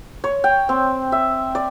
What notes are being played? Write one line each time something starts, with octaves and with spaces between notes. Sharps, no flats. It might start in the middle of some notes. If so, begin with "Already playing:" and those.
C#5
G5
C4
E5
D5